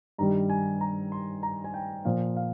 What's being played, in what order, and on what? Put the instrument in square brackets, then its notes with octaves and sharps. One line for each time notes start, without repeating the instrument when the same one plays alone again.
[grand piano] G2 D#3 G3 A#5
G#5
A#5
C6
A#5
G#5
G5
A#2 F3 F5
F5